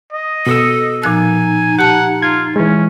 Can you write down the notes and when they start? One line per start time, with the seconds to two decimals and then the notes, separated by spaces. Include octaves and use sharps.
0.13 D#5
0.47 B2 A4 D#6 E6
1.03 A#2 F3 D#4 G#5 F#6
1.79 G4 F#5 A5
2.22 F4 G#6
2.56 E3 G#3 C#4